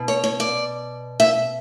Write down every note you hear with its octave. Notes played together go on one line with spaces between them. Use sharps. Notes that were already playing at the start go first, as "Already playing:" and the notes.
Already playing: B2
C#5
C#5
D5
E5